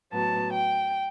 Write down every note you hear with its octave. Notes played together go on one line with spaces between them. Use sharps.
A2 F#3 B3 A5
G5